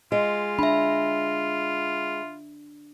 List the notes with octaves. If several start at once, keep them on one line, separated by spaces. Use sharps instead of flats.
G#3 F4
D4 E5 B5